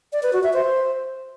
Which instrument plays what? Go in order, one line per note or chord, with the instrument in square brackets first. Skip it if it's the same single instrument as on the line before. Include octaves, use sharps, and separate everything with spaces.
[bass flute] D5
B4
F#4
E5
C5